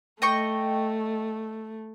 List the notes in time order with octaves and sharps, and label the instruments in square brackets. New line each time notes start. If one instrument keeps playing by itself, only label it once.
[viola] A3 [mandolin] D#5 G5 C#6